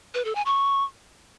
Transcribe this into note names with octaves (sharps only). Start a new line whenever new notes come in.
B4
A4
G#5
C#6